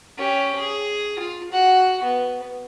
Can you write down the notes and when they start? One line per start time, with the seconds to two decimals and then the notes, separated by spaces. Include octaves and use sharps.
0.18 C#4 G4
0.59 G#4
1.19 F4
1.51 F#4 F#5
2.03 B3